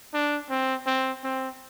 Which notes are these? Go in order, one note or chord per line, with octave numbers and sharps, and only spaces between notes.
D4
C4
C4
C4